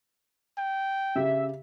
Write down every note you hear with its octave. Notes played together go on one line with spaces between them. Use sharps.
G5
C#3 G4 E5